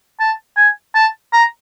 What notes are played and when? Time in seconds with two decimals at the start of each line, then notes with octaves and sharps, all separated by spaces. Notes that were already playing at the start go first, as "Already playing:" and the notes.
0.20 A5
0.57 G#5
0.95 A5
1.33 A#5